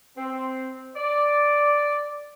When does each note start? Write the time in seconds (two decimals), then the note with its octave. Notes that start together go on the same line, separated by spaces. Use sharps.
0.17 C4
0.96 D5